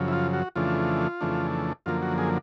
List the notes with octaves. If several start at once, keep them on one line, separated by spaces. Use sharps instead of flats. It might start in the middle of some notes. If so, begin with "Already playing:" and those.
Already playing: F#2 C#3 F3
E4
F4
F#4
F2 C#3 E3 A3 D4 F4
F2 C#3 E3 A3 D4
F#2 D3 F3 A#3 F4
F#4
G#4